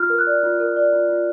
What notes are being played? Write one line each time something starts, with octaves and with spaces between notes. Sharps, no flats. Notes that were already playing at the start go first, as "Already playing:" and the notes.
Already playing: F4 F6
A#4
F#6
D5
F4
A#4
D5
F4
F4